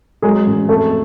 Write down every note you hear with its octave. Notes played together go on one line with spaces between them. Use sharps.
F#3 G#3 G#4
A1
F2 A3 A4